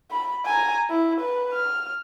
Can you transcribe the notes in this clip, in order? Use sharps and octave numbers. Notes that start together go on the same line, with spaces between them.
B5
G#5 A#5
E4
B4
F6